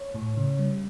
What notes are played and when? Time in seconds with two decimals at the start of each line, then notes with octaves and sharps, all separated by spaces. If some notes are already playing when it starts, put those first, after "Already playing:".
Already playing: C#5
0.14 A2
0.37 C#3
0.59 G3